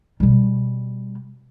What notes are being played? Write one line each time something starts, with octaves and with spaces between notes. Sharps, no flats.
B2 G3